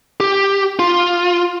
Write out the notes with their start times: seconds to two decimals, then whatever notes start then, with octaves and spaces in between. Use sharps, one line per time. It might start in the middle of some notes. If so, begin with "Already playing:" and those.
0.20 G4
0.79 F4